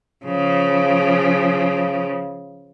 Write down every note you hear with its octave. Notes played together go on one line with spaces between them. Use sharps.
C#3 F3